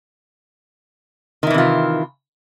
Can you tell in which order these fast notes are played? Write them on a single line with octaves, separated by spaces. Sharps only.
D#3 E4 E3 C3 F4